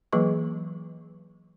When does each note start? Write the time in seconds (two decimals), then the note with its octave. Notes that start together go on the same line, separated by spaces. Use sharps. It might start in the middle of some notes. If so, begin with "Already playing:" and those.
0.13 E3 F#3 A#3 G#4 B4 C#6